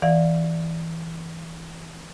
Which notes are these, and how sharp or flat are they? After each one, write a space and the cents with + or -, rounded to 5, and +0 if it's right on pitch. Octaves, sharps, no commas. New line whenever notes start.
E3 -5 D5 +0 F5 +30